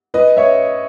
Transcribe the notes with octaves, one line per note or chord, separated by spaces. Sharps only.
B4 D#5
C#5 E5